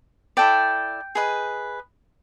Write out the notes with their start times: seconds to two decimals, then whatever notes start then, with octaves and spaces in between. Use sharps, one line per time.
0.37 E4 A4 D5 G5
1.15 G#4 B4 D#5